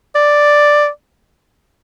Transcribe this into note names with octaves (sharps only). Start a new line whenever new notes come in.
D5